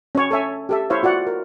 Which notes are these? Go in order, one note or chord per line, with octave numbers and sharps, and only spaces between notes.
C#4 C#5
A4 C#5 E5 G#5
G4 A4 E5
E4 C5 C#5 E5 F5
F4 F#4 D5 F#5
A#4